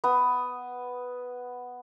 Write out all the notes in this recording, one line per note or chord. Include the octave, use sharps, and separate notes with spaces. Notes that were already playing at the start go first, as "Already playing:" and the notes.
B3 D#6